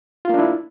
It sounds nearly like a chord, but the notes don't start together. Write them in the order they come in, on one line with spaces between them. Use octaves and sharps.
F4 A#3 D4 E4